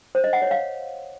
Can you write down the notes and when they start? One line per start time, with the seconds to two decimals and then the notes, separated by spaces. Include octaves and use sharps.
0.15 C5
0.24 D#5
0.33 F#5
0.42 C#5
0.51 F5